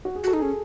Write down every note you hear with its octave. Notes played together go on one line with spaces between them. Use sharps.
F#4
G#4
F#4 A4
D#4
C#4 G#4